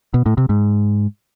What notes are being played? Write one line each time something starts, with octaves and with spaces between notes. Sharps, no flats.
B2
A2
C3
G#2